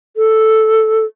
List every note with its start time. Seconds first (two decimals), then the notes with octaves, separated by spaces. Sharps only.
0.17 A4